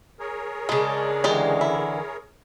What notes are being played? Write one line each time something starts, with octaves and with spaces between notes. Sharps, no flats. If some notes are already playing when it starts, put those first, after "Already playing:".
G#4 A#4 C#5
C#3 G#3 D4
D3 E3 G#3 G4 D5
E4